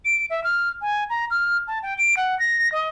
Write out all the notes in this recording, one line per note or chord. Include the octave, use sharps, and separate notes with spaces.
D7
E5
F6
G#5
A#5
F6
A5
G5
D7
F#5
A#6
D#5